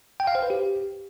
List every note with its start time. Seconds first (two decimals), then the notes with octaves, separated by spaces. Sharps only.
0.20 G5
0.27 F5
0.35 C5
0.43 B4
0.50 G4